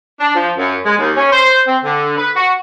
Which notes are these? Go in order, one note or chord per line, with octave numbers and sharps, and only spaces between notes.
D4
F3
F#2
G#3
D#2
C#4
C5
C4
D3
B4
F#4